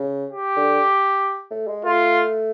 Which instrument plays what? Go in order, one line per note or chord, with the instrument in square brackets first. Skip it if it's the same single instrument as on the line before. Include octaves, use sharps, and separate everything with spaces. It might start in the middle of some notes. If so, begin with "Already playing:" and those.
Already playing: [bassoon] C#3
[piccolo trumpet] G4
[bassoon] D3
A3
G#3
[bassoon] A3 [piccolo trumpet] F4